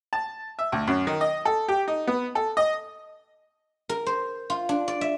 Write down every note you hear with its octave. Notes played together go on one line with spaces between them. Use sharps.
A5
E5
D2
F#2
D#3
D#5
A4
G4
D#4
B3
A4
D#5
A#4
C5
F4
D4
D5
E5